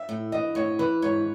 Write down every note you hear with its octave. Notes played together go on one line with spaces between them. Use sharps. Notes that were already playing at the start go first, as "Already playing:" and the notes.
Already playing: E5
A2
E3 D#5
A2 C#5
E3 B4
G#2 C#5